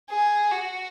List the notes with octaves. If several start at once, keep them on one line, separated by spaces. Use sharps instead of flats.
G#4
F#4